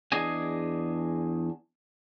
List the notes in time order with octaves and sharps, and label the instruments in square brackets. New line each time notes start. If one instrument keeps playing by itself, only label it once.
[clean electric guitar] E2 D4 G#4 D#5 G#5